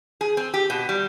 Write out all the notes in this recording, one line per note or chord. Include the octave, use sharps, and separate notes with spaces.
G#4
C4
G4
B2
G3